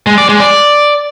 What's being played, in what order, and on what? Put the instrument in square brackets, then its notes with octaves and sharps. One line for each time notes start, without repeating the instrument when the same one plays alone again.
[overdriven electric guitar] G#3
D5
G#3
D5